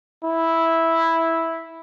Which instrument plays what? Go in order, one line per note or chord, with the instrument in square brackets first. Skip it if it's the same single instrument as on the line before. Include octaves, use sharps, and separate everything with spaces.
[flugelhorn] E4